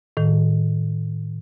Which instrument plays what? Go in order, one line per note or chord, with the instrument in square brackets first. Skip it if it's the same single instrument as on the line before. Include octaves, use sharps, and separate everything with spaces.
[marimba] A2 D#3